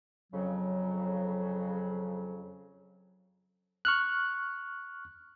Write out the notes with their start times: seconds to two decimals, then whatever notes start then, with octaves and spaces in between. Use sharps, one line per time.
0.33 F2 C#3 F#3
3.85 C#6 F6 F#6